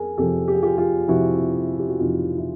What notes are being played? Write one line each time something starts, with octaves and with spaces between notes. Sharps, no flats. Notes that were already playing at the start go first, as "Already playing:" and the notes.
Already playing: F2 G#4 A#4
F2 C3 F3 G4 A4
G4
G#4
F4 G4
F4 G4
F2 C3 F3 E4 F#4
G4
F#4
F2 C3 F3 D#4 F4
E4